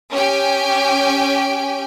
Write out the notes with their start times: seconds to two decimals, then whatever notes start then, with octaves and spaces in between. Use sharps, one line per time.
0.12 C#4 G4 G5 G#5